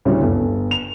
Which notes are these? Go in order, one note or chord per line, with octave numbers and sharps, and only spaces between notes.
D2 A2 C#3 G3 C#4
G1
F7